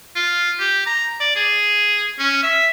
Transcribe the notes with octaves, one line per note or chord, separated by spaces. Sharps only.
F4
G4
A#5
D5
G#4
C#4
E5